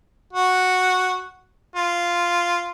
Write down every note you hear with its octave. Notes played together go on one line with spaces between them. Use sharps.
F#4
F4